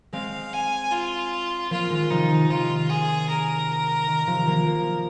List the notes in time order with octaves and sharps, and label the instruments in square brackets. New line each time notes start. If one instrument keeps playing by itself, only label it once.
[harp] G#3 C4 [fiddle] F5
[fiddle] G#5
F4
[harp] F3 A#3 [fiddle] F4
[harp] D#3 G#3
[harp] C3 F3 [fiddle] D#4
[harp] D#3
[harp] C3 [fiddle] F4
[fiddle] G#4
A#4
[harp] D#3
C3 F3
F3 A#3
F3 A#3